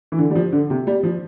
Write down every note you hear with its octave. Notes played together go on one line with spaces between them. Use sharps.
E3
D3
G3
F3
D3
C3
G3
F3